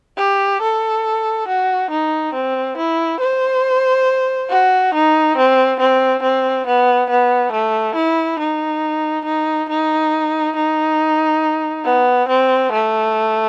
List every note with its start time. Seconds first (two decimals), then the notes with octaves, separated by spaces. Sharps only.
0.17 G4
0.62 A4
1.48 F#4
1.91 D#4
2.34 C4
2.77 E4
3.20 C5
4.50 F#4
4.94 D#4
5.37 C4
5.80 C4
6.22 C4
6.67 B3
7.10 B3
7.52 A3
7.95 E4
8.39 D#4
9.25 D#4
9.69 D#4
10.56 D#4
11.85 B3
12.28 C4
12.72 A3